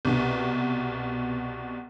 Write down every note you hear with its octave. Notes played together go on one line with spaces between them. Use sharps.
C2 B2